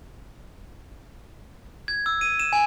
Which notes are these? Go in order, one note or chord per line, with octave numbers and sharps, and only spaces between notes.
G#6
E6
D#7
E7
G#5